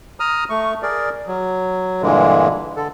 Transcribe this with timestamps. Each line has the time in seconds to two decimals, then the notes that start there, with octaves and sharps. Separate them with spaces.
0.20 A#5 D#6 F6
0.50 A3 C#6
0.83 G#4 A#4 D5
1.27 F#3
2.02 G2 A#2 D3 E3 G#3
2.76 D3 A4